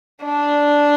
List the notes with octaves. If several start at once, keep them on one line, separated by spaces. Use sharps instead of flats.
D4